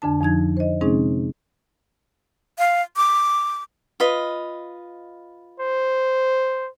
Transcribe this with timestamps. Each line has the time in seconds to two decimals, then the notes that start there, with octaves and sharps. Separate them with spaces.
0.02 F2 D3 D4 A5
0.20 F2 F3 D#4 G#6
0.57 C5 D#5
0.81 C3 G#3 C4 C#4 D#4 G#4
2.58 F5
2.96 D6
4.00 F4 B4 D#5
5.60 C5